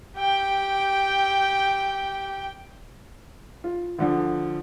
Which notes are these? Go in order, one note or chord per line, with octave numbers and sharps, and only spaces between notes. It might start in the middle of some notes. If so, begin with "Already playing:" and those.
G4 G5
F4
D2 D3 F3